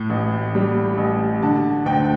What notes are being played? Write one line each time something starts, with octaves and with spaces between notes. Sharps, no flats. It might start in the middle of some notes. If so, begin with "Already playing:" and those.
Already playing: A2
A1
G3
A1
D3 A5
D2 G5